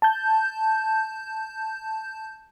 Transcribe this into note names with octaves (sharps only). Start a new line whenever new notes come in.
A5 G6